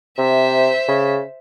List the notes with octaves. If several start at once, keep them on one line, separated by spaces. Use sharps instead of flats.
C3 C5 E5
C#3